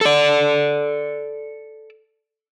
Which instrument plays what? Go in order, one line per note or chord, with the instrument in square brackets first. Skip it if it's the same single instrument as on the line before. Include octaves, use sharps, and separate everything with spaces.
[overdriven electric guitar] A4 D5